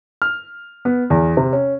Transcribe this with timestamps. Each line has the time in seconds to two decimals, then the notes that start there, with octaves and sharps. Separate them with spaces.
0.22 F6
0.85 B3
1.10 E2
1.37 C3
1.53 C#4